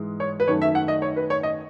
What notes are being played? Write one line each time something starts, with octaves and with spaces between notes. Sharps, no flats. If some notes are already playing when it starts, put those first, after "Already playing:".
Already playing: G#2 E3 G#3
C#5
B4
F#2 D#3 A3 C#5
E5
F#5
D#5
C#5
B4
C#5
D#5